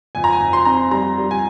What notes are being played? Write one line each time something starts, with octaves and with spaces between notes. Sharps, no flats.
F2 G#5
A#5
G#5
F2
C6
C4 A#5
C6
G3 A#5
G3
G#5